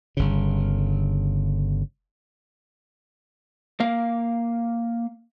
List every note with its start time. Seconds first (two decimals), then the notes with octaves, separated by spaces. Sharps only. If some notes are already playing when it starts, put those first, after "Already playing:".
0.17 G1 C#3
3.80 A#3 F5